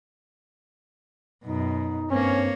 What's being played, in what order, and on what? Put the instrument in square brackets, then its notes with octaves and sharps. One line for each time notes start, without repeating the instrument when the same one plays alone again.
[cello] F#2 B2 [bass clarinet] D#4
[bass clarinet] G2 [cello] A#3 C#5 [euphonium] C4 [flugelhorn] C#4